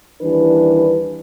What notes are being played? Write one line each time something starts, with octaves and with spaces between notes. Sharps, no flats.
D#2 E3 G3 D4 B4